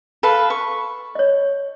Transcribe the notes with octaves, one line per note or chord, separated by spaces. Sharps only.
A4 B4 F5
C#6
C#5 D#5